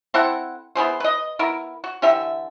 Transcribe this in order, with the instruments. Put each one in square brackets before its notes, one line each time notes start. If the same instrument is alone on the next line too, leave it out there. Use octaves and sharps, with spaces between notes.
[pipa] C4 E4 A4 F#5
B3 E4 G#4 C5
B4 D#5
B3 E4 A#4
F#4
D3 E3 G4 E5